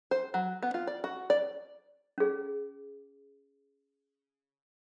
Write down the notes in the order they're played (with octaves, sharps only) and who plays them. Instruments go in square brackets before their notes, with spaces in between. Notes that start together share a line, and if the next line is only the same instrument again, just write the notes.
[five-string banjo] C5
F#3
B3
F4
D5
F#4
D5
[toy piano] C#4 G#4